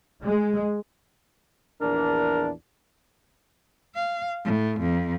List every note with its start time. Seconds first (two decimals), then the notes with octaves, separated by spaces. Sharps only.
0.22 G#3
1.81 A#1 E2 D4 A#4
3.94 F5
4.44 A2
4.79 F2